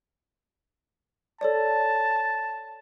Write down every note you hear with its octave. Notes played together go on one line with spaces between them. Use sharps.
A4 C#5 D5 A5